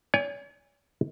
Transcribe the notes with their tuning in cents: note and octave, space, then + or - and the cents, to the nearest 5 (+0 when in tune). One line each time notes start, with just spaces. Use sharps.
C#5 +45 G#5 -25